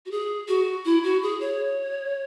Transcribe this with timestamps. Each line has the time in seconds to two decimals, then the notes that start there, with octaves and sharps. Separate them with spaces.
0.06 F#4
0.11 G#4
0.48 F#4
0.85 E4
1.04 F#4
1.22 G#4
1.41 C#5